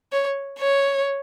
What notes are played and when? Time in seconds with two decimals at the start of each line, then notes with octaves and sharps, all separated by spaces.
0.12 C#5
0.59 C#5